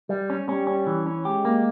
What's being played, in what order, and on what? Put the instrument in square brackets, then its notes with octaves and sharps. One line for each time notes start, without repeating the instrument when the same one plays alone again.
[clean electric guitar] G3
C#4
[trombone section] G3 [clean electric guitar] C#4
[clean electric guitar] C#4
E3
C#4
[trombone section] G#3 [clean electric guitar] G4
[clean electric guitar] A#3